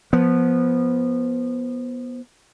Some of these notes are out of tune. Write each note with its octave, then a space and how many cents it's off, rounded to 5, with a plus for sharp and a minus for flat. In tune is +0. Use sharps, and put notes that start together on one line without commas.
F3 +0 B3 -15